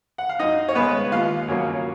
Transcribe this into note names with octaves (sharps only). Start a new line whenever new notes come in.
F#5
F5
F#2 D#4 D#5
C#5
C#3 G#3 B3 B4
D#2 F4 F5
C#3 F#3 A#3 C#4